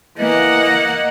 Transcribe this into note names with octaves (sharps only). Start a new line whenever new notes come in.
E3 A#3 D#5 F#5